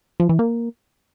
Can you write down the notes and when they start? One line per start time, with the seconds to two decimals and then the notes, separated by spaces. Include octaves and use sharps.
0.20 F3
0.29 E3
0.39 A#3